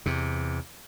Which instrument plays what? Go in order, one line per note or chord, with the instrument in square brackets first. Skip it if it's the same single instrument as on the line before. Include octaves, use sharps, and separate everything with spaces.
[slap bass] E2 C3